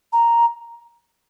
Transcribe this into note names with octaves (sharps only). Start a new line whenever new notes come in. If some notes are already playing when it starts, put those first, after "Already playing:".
A#5